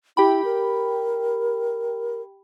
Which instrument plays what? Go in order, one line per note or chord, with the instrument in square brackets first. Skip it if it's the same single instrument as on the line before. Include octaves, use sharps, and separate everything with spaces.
[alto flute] E4 [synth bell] G4 G5 B5
[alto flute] A#4